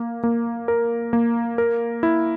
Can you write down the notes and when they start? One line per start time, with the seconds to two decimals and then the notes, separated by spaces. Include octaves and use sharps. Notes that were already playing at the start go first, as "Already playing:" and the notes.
Already playing: A#3
0.23 A#3
0.68 A#4
1.13 A#3
1.58 A#4
2.03 E4